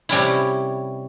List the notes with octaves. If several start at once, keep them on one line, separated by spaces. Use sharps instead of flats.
C3 G3 C#4 E4